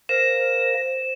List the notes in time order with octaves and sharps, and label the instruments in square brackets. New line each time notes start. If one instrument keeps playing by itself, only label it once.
[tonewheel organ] A#4 F5 A#6 [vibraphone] C5 [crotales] E7